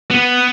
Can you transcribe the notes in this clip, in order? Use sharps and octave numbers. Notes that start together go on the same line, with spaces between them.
B3